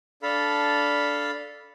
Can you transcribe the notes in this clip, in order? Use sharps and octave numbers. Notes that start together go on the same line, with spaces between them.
D4 A4 F5 B5